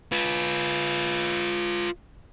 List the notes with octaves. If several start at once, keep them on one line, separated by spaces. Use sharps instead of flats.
F4 B4